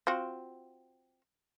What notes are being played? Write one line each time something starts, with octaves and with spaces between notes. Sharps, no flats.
C4 F4 F#4